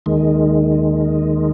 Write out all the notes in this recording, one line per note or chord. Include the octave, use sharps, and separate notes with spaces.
D#2 D#3 G#3